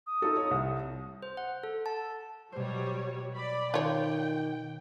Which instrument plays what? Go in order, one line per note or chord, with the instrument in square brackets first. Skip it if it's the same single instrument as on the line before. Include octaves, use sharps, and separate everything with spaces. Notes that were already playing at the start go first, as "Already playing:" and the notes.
[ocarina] D#6
[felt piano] D#4 F4 A4
C#5
C2
[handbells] C5
F#5
A4
A5
[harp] B2 C5 [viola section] F#3 G3 C#5
[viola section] D5 B5
[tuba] D#3 [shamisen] F4 C#5 [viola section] G5